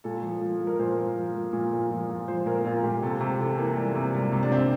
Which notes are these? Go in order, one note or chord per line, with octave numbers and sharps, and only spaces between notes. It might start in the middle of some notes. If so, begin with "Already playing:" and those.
A#2 A4
F3
F3
F3
A#4
A#2 C5
F3
F3
F3
A#2
A#2
F3
A#2
F3 C5
A#2 A#4
A#2 F4
A#2 G4
C3 A4
C3
G4
E3 A4
E3 A#3
G3
C3
G3
C3
D4
C3 C4